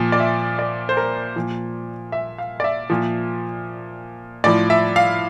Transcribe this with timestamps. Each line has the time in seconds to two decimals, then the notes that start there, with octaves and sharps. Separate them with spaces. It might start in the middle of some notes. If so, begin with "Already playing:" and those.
Already playing: A#2 F3
0.12 D5
0.20 E5
0.59 D5
0.89 C5
0.97 A#4
1.36 A#2 F3
2.12 E5
2.38 F5
2.60 D5
2.64 E5
2.90 A#2 F3
4.44 A2 F3 D5
4.70 E5
4.96 F5